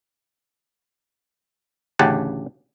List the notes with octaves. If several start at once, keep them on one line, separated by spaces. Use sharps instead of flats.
A1 D2 C#3 G4 F#5 A5